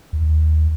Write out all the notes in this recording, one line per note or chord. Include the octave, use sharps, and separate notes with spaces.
D#2